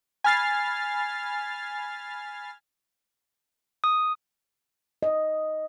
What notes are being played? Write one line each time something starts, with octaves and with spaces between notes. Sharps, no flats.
G#5 B5 F6 A6 C7
D#6
D#5